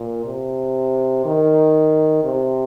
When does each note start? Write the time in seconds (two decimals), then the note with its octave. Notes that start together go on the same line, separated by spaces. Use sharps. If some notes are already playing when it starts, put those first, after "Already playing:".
Already playing: A#2
0.26 C3
1.25 D#3
2.24 C3